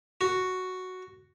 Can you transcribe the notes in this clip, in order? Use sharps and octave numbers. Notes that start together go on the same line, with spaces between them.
F#4